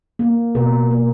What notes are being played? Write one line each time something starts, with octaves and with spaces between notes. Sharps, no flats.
A#3
B2 A#4
A#3